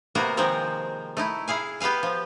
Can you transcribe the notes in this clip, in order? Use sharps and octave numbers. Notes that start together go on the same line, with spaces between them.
C3 A#3 B3 F#4 A#4
D#3 F3 G#3 C4 F#4 A#4
A3 D#4 E4
E4 G#4 F5 G#5
B3 G4 B4 F5 G#5
F3